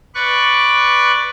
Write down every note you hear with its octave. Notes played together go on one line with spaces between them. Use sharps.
B4 D5 C#6 F#6